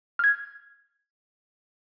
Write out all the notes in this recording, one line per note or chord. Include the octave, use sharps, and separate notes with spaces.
F6 G#6